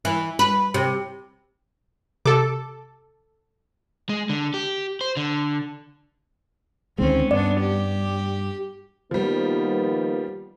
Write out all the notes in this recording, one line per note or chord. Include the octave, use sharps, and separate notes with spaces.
E3
B4
C3
C3 A4 D6
G#3
D3
G4
C5
D3
D2 D#3 G#3 C4 C#4
G2 B3 D4 D5
G4
D#3 F3 G3 A#3 B3